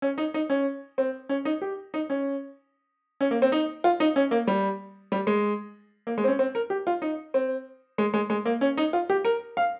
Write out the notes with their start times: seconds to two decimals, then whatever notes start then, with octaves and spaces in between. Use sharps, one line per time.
0.02 C#4
0.18 D#4
0.34 D#4
0.50 C#4
0.98 C4
1.29 C#4
1.45 D#4
1.62 G4
1.94 D#4
2.10 C#4
3.21 C#4
3.31 A#3
3.42 C4
3.52 D#4
3.84 F4
4.00 D#4
4.16 C#4
4.31 A#3
4.47 G3
5.12 G3
5.27 G#3
6.07 A#3
6.18 G#3
6.24 C4
6.28 C#4
6.39 C4
6.55 A#4
6.70 G4
6.87 F4
7.02 D#4
7.34 C4
7.98 G#3
8.14 G#3
8.30 G#3
8.45 A#3
8.61 C#4
8.77 D#4
8.93 F4
9.10 G4
9.25 A#4
9.57 F5